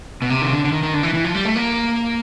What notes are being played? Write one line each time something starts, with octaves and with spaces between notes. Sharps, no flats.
B2
C3
D#3
D3
D3
D#3
D#3
D3
E3
E3
F3
G3
A3
A#3